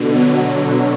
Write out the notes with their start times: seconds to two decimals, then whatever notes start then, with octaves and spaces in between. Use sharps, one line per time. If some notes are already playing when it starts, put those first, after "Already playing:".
Already playing: B2 D3
0.15 F#3